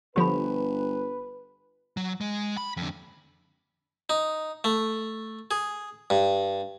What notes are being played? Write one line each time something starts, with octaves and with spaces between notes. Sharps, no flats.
G1 D3 F3 G4 B4 B5
F#3
G#3
B5
F2 D3
D#4
A3
G#4
G2